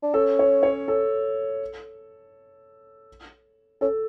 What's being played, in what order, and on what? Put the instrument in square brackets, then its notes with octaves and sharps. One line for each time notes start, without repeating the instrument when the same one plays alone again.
[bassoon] D4
[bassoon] C#4 [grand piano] A4
[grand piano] C#5
C#5
A4
[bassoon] C#4 [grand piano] A4